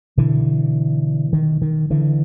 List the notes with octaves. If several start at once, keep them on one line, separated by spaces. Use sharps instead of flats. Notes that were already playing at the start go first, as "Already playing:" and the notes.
B2 D3 E3
D#3
D#3
D3 E3